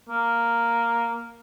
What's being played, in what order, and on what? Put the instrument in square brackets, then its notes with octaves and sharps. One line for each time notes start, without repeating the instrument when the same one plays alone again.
[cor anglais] A#3